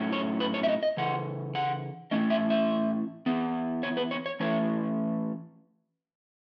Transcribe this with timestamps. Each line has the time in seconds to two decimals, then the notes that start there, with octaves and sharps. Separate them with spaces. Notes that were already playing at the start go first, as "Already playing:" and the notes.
Already playing: A2 F#3 C#4
0.12 C#5
0.40 B4
0.54 C#5
0.63 E5
0.68 D#5
0.83 D#5
0.97 C#3 E3 F#5
1.55 F#5
2.11 A2 E3 A3 C#4 D#5
2.30 E5
2.50 E5
3.26 E3 B3
3.83 C#5
3.97 B4
4.11 C#5
4.26 C#5
4.40 E3 A3 C#4 C#5